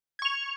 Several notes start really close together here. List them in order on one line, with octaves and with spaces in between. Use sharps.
G#6 C#6 F7